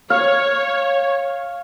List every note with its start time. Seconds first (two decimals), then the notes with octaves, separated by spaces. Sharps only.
0.10 C#5 F5